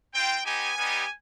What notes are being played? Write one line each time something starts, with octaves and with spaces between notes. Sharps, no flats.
C4 F4 G5
B3 D#4 G4 G#5
G3 B3 D#4 G4